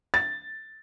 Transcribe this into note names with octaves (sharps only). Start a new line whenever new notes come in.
A6